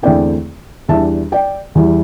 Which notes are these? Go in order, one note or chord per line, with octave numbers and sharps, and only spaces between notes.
E2 D3 A3 C4 E4 D5 G5
E2 E3 G3 D4 E5 A5
D5 G5
E2 E3 G3 E4